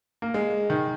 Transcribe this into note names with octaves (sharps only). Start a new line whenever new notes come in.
A#3
G#3
D#3